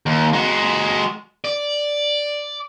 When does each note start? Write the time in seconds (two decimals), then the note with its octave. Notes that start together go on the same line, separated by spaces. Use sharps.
0.06 D#2
0.33 G#3 F#4
1.44 D5